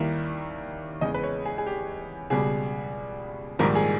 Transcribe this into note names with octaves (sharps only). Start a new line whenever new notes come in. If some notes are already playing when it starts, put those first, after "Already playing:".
Already playing: D#2 D#3 G3 A#3 E4 E5
E2 C#3 G#3 D#5
B4
C#5
G#4
G#4
G4
C#2 B2 G3 G#4
A#1 G#2 D#3 G3 A#4
G#4